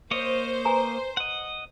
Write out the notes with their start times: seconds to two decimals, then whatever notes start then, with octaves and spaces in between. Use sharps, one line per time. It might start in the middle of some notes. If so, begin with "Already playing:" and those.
0.11 A#3 C5 C#5 D#5
0.65 B4 G#5 A#5
1.17 D#5 F#5